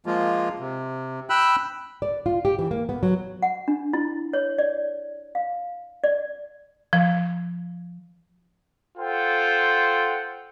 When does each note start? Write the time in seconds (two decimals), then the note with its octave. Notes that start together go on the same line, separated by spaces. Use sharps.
0.06 F3 G#3 A#3 F4
0.59 C3
1.30 G5 B5 E6 F#6
2.02 D5
2.26 F4
2.45 G4
2.59 E3
2.71 A#3
2.89 B3
3.03 F#3
3.42 F#5
3.68 D4
3.93 E4
4.33 C#5
4.58 D5
5.35 F5
6.04 D5
6.93 F3
8.98 F4 A4 C5 F#5 G5